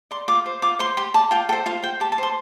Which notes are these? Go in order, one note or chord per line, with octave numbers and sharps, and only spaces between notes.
D5 C6
F4 D6
C5
F4 D6
C5 C6
G4 C6
D5 A5
F4 G5
A4 C5 G5
F4 F5
C5 G5
G4 A5
A5
C5 C6